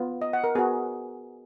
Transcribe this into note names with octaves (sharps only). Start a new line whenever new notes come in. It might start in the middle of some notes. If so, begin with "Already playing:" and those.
Already playing: B3 F4
D#5
F#5
A#4
B3 F#4 G#4